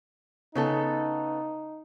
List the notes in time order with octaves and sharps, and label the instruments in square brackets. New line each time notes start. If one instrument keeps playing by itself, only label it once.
[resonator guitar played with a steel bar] C#3 B3 A4 [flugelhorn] D#4